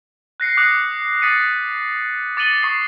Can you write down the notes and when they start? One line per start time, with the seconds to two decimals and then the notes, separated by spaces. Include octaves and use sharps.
0.40 F#6 A#6 C7 C#7
0.57 D6 D#6 F#6 A#6 C#7
1.22 D#6 A6 B6 C#7 D#7
2.37 D6 A6 C#7 D#7 F#7 G7
2.62 C#6 D#6 C7